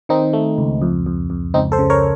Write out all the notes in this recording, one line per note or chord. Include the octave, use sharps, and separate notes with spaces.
D#3 C4 D#4
A3
C#2
F2
F2
F2
C#2 C4 D#4
A4 C5
C#3
A#4 C#5